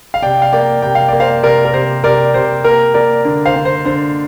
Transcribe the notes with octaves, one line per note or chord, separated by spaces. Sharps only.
F5
C3 D5 G5
F5
A#3 D5 G5
C3 G5
F5
A#3 D5
C5 F5
C3 A#4 D5
A#4
C3 C5
C3 A#4 D5
C3 C5
A#3 A#4
A#3 A#4 D5
D3
C5 F5
D3
C5
D3 C5